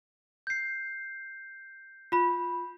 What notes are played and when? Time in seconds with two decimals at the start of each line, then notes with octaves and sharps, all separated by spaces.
0.47 G6 C7
2.12 F4 B5